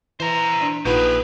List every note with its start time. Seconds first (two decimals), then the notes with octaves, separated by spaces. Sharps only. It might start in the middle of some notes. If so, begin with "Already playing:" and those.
0.20 E3 C5 A#5
0.61 D4 D5
0.85 A#1 D#4 F4 G4 G#4 B4 F#5